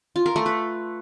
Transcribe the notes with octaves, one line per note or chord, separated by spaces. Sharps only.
F4
A#4
A3
B4